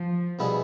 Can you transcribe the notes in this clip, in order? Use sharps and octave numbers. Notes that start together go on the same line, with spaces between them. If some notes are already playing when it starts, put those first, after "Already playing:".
Already playing: F3
B2 G3 B3 E4 G#4